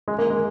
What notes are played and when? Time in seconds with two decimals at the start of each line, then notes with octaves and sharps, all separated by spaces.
0.08 G#3
0.19 A#3
0.30 G#3